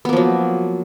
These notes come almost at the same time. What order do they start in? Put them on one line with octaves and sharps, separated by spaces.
B3 A#3 F3 F#3